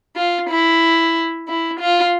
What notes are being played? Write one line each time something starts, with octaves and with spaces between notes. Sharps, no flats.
F4
E4
E4
F4